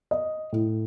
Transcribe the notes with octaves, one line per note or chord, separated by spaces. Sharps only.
D#5
A2